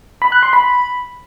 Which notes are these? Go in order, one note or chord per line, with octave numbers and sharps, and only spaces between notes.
B5
F#6
C6
B5